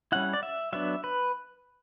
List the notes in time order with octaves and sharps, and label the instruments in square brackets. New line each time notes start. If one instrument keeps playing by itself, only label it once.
[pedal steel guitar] G3 C#4 E4 F#5
D5
E5
F#3 B3 D4 E5
B4